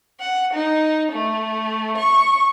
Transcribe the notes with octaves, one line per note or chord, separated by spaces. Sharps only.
F#5
D#4
A3
C#6